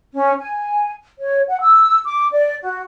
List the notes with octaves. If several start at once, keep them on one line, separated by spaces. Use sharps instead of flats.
C#4
G#5
C#5
F#5
E6
D6
D5
F#4